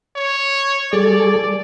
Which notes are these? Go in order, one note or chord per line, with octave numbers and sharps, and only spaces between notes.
C#5
G3 G#4 A4 D5